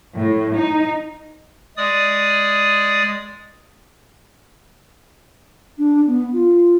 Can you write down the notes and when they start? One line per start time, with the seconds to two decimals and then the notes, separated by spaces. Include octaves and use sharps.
0.16 A2
0.56 D#4
1.77 G#3 D5 D#6
5.78 D4
6.07 B3
6.33 F4